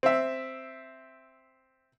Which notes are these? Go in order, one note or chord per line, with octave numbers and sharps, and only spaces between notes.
C4 E5